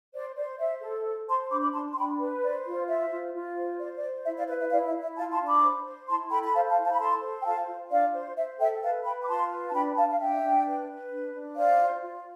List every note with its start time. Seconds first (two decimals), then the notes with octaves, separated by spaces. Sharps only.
0.14 C5 D5
0.36 C5 D5
0.59 C5 E5
0.81 A4
1.05 C5
1.27 C5 A5 C6
1.50 D4 B5 D6
1.62 B5 D6
1.73 D4 A5 C6
1.92 C6
1.96 D4 G5 B5
2.19 B4
2.42 C5 D5
2.65 F4
2.88 C5 E5
3.11 F4
3.34 F4
3.57 C5
3.79 C5 D5
3.96 D5
4.02 C5
4.25 E4 E5
4.36 D5 F5
4.48 B4 E5
4.59 E5
4.70 E4 D5 F5
4.86 E5
4.94 E4
5.01 E5
5.16 F4 F5 A5
5.32 A5 C6
5.39 D4
5.46 B5 D6
5.62 C5
5.85 C5
6.07 E4 A5 C6
6.30 A4 G5 B5
6.44 B5
6.54 C5 F5 A5
6.69 F5 A5
6.76 E4
6.84 F5 A5
6.91 B5
6.99 A4 A5 C6
7.21 C5
7.41 G5
7.44 F4 F5 A5
7.67 F4
7.90 D4 D5 F5
8.14 C5
8.36 C5 E5
8.59 A4 E5 G5
8.81 B4 F5 A5
9.04 B4 G5 B5
9.21 D6
9.27 F4 A5 C6
9.51 B4
9.68 A5
9.74 D4 G5 B5
9.96 D4 F5 A5
10.10 F5
10.19 D4 E5 G5
10.42 D4
10.66 B4
10.88 B4
11.10 D4
11.34 D4
11.56 C5 D5 F5
11.79 F4
12.02 F4